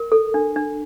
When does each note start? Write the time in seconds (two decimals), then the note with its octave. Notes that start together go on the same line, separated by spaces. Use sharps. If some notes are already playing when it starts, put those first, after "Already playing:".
Already playing: A#4
0.12 A4
0.34 D4
0.56 D4